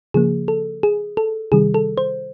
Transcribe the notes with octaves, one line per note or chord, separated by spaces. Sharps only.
C#3 F3 A#3 G#4
A4
G#4
A4
C3 D#3 G3 G#4
A4
C5